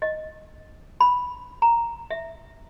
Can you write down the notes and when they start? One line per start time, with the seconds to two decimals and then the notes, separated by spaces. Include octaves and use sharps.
0.02 D#5
1.00 B5
1.62 A#5
2.11 E5